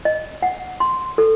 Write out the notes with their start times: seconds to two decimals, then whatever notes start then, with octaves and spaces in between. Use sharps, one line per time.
0.05 D#5
0.43 F#5
0.80 C6
1.18 A4